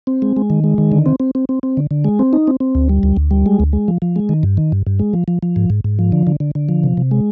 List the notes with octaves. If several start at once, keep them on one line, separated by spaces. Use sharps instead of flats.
C4
G#3
G#3
D#3
G#3
D#3
D3
C4
C4
C4
C4
C4
D3
D3
G#3
C4
D#4
C4
C4
D2
G3
D2
D2
G3
G#3
D2
G#3
F3
F3
G#3
D#3
G2
D#3
G2
G2
G#3
F3
F3
F3
G#2
G#2
G#2
F3
D3
D3
D3
D3
F3
C3
C3
G#3